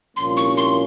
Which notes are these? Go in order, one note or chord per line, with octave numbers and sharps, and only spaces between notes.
C2 A#2 F3 A#3 C#4 C6
C#6
C6